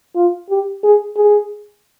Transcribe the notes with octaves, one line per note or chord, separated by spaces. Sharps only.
F4
G4
G#4
G#4